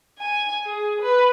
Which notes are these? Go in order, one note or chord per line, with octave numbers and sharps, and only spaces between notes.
G#5
G#4
B4